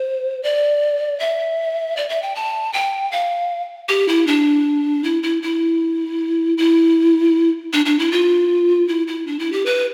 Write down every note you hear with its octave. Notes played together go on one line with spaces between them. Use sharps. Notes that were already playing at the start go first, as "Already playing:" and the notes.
Already playing: C5
D5
E5
D5
E5
G5
A5
G5
F5
G4
E4
D4
E4
E4
E4
E4
D4
D4
E4
F4
E4
E4
D4
E4
G4
B4